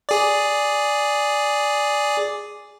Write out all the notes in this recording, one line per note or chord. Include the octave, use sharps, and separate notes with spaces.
G#4 D5